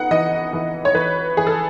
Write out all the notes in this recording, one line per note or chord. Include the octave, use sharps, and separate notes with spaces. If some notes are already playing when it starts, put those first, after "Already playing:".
Already playing: B3 D#4 F#5
E3 D#5
E3
C#5
E3 B4
E3 G#4
A4